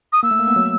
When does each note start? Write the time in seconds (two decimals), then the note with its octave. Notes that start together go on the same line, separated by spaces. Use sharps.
0.12 D#6
0.23 A#3 E6
0.31 A3
0.39 A#3
0.48 B3
0.56 F#3